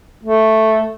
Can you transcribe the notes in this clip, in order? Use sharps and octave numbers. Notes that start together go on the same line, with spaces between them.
A3